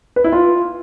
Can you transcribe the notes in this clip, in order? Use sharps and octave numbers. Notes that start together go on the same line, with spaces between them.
B4
E4
F4